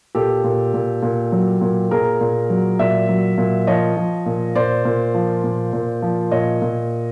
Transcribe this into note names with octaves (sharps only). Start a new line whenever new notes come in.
A#2 G4 A4
A#2
A#2
A#2
F#3
A#2
A#2 G#4 A#4
A#2
F#3
A#2 D5 E5
F#3
A#2
F3 C#5 D#5
F3
A#2
A#2 C5 D5
A#2
F3
A#2
A#2
F3
A#2 C#5 D#5
A#2